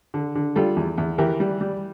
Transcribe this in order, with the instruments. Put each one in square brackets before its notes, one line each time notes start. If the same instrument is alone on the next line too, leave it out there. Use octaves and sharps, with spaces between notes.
[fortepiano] D3
D3
G3 F4 A4
E2
E2
E3 G4 A#4
G3
G3